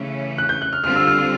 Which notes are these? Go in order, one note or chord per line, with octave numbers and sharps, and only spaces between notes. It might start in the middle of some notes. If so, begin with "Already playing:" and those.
Already playing: C#3 E3 A3 C#4
F#6
G6
F#6
F6
D3 G3 C4 F4 F6
E6
F6
F6